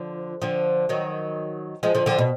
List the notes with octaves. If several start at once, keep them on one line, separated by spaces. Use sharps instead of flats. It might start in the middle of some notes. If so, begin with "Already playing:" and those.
Already playing: D3 F3
D3 F3
D#3 F#3
F3 G#3
D3 F3
D3 F3
B2